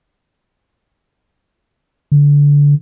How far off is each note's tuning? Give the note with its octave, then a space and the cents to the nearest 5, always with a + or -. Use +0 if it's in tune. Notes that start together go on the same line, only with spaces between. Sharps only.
D3 -25